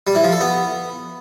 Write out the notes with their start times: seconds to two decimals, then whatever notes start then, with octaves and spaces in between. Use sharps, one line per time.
0.07 G3
0.15 E3
0.24 F3
0.32 A4
0.41 B3